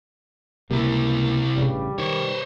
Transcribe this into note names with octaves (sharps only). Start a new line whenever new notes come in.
C#2 C3 G3 A#3 E4
A1 G2 C#3 G3
D#3 C5 C#5